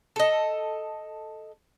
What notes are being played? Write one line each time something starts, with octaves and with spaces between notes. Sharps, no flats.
A4 D#5